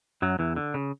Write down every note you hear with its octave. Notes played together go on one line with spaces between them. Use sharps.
F#2 F#3
E2 E3
D3
C#3